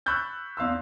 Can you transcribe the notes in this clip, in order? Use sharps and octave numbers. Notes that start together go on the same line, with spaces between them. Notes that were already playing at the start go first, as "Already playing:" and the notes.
B5 C#6 E6 F#6 G6 A6
E2 F5 C6 E6